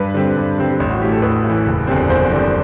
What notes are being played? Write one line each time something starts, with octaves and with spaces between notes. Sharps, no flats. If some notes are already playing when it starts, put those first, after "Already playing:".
Already playing: G2 B4
D3 G3 C4
G2
D3 G3 C4
A1
F#4
A2 E3 G4
A4
A1 B4
A2
E3
F#1
E2 D3 G3 C4
F#1 C5
E2 D3 G3 C4